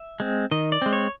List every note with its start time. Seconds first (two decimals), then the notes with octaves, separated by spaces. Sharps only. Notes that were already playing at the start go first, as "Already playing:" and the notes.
Already playing: E5
0.20 G#3 C4
0.51 D#3 D#5
0.72 D5
0.82 G#3 C4
0.93 C#5